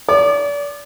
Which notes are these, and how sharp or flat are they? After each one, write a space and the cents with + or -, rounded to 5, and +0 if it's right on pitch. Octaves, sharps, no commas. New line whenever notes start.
D5 -35 D6 +35